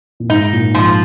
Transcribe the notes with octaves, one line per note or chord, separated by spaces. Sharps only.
A#2
G#2 D#4
A#2
G#2 F3